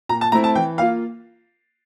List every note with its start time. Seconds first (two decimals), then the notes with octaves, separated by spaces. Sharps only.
0.09 A#2 A#5
0.21 A5
0.32 A3 C4 E4 A#5
0.44 A5
0.55 E3 G5
0.78 A#3 F4 F5